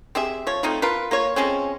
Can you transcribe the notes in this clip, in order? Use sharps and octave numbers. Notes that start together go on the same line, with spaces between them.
C4 G4 G#4 E5
F3 C#5
A3 C4 D#4 F4
F4 A#4 B4
A#3 F4 C#5
F3 G#3 C4 C#4